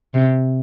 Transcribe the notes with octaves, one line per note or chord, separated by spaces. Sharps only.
C3